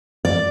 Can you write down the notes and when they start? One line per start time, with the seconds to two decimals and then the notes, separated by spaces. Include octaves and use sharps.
0.25 D5